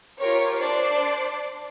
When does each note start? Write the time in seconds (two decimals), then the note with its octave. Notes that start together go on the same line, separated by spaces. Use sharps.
0.20 F4 G4 A#4 C#5
0.57 D4 C5 D5 C7